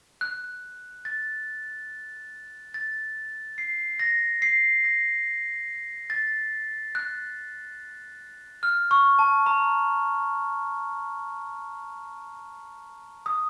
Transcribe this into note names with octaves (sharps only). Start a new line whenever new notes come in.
F#6
A6
A6
C7
A#6
C7
A#6
A6
F#6
F6
C#6
A5
A#5
D#6